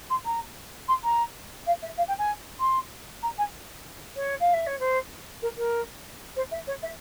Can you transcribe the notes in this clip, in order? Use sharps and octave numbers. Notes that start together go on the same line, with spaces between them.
C6
A#5
C6
A#5
F5
E5
F5
G5
G#5
C6
A#5
G#5
C#5
F5
E5
C#5
C5
A#4
A#4
C5
E5
C#5
E5